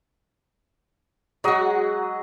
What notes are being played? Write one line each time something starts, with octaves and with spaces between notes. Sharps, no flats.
F#3 G#3 F#4 D#5